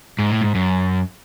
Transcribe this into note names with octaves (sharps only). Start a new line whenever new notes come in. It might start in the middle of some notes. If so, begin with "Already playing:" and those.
G#2
A2
G#2
F#2